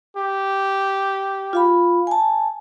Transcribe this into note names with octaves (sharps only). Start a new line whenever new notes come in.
G4
F4 F5 B5
G#5 A5